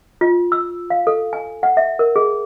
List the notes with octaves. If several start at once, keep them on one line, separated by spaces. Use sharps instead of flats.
F4
E6
F5
A4
G#5
F#5
E5
A#4
G#4